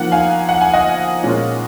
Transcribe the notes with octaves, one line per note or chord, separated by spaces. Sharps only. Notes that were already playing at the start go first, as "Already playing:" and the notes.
Already playing: F3 A#3 D#4 F#5
F5 G#5
F#5
G#5
D#5 F#5
A#2 G#3 C#4 F4